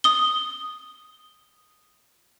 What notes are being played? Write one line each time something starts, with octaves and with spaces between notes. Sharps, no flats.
D#6 G7